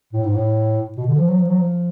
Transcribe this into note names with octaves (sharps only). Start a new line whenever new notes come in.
A2
G#2
A2
B2
D3
F3
F#3
F3
F#3
F3